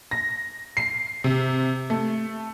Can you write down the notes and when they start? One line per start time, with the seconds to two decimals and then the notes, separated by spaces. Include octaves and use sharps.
0.11 A#6
0.77 C7
1.24 C3
1.90 A3